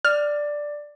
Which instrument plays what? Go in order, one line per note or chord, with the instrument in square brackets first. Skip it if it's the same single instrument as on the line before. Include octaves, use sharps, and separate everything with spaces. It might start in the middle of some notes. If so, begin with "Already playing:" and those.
[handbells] D5 [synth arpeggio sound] F6